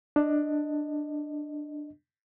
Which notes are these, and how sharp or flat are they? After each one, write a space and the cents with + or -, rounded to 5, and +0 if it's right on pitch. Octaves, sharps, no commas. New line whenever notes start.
D4 +10 D#5 +0